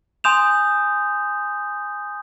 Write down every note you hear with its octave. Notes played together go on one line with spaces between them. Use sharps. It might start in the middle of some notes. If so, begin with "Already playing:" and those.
G#5 C6 D#6 G6 E7 F7